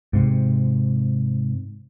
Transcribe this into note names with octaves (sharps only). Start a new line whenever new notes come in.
G#2 C3